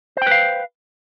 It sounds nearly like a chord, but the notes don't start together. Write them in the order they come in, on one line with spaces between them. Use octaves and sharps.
C5 G5 B4 F5